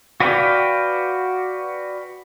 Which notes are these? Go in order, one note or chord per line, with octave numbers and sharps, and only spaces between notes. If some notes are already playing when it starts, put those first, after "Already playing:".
F#4 B4 D5 F5 G5